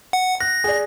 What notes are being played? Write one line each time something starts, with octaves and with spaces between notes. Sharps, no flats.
F#5
F#6 A#6
G#4 D5